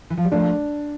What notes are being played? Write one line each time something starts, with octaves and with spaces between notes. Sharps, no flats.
E3
F3
G3
F3 A3 D4